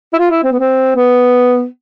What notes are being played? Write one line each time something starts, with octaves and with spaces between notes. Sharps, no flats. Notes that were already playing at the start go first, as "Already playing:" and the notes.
E4
F4
E4
C4
B3
C4
B3